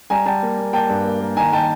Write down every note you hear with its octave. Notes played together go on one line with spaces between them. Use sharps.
G3 G#5 A#5
G3 G5 A5
A#3
A#3
A#3 G5 A5
G2
A#3
A#3
D#3 G#5 A#5
D#3 G5 A5